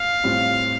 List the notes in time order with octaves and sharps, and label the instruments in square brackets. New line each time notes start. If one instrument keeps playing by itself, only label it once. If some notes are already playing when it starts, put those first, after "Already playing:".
Already playing: [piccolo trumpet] F5
[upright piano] A2 G3 C4 F4 C5